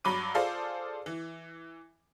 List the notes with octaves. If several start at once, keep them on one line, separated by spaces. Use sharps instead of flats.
G2 F#3 B5 D6 D#7
F4 G#4 A4 C5 D5 F5
E3